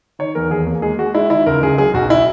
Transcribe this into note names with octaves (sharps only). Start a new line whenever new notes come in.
D#3 C#5
E2 A#4
D#2 G#4
A#3
G#3 G#4
G#3 F#4
G#3 E4
D#3 E4
C#2 A#4
C#2 G#4
F#3 G#4
B1 F#4
E4